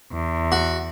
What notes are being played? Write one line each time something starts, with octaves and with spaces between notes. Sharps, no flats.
E2
F#4